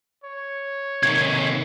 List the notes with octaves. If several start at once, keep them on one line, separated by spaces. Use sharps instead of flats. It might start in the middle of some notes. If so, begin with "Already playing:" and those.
C#5
C3 D#3 G#6